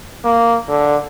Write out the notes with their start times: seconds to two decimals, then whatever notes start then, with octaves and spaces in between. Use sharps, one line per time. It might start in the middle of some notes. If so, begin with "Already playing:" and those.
0.24 A#3
0.68 D3